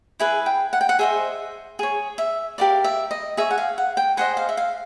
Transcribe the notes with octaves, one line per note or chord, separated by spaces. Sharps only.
E4 G#4 B4 G#5
G5
F#5
G5
F#5
G#4 C5 D#5 E5
G#4 C#5
E5
G4 A#4 D5 F5
E5
D#5
G#4 C#5 E5
F#5
F5
F#5
G5
G#4 C5 D#5 F#5
F5
E5
F5